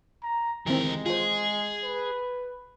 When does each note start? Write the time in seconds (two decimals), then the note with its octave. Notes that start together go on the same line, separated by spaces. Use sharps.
0.23 A#5
0.66 D2 D#3 E3 G#3 C4 A#4
1.06 F4 G#4 C5
1.83 B4